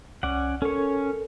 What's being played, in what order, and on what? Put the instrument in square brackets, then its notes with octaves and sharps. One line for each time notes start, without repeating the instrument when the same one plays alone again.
[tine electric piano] C2 [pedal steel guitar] C#4 D5 F#5
[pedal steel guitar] C#4 C#5 [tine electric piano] A4 A#4